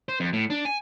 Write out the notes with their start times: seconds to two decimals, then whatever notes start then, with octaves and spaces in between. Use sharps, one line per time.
0.09 C5
0.20 F2
0.33 A2
0.50 D4
0.65 G#5